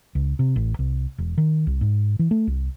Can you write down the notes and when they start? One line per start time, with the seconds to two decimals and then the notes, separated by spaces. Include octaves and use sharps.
0.15 C#2
0.39 C3
0.56 A1
0.79 C2
1.18 E1
1.38 D#3
1.67 C2
1.81 G#2
2.19 E3
2.31 A3
2.47 C2